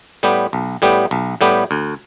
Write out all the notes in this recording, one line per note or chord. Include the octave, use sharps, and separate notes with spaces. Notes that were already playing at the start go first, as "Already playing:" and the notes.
A2 G3 B3 G4
B1
A2 G3 B3 G4
B1
A2 G3 B3 G4
D2